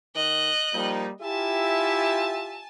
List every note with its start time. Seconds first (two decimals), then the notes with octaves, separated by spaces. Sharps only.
0.15 D#3 D#5 F#6
0.74 F3 G3 A#3 D#4
1.21 E4 F4 G4 E5 G#5 A5